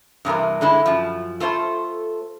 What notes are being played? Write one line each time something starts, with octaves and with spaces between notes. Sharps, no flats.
G2 C3 E3 A#4
D3 G#3 E4
F#2 F3
A3 F4 A4 C5